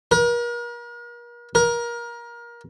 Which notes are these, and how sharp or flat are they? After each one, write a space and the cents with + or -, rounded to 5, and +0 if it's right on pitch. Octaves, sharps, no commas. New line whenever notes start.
A#4 +40
A#4 +25